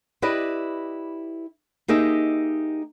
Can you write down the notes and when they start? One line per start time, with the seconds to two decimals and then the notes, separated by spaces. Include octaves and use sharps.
0.22 E4 G4 B4 D5 D#5
1.88 A#3 D#4 G4 G#4 D#5 E5